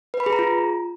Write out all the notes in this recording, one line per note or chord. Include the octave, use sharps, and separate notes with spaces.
B4
B5
G#4
A#5
F4